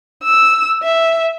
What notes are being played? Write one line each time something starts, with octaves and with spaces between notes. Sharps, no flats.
E6
E5